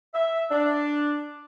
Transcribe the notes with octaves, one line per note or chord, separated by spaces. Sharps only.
E5
D4